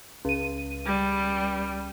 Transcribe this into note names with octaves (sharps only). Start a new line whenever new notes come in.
C#2 D#7
G3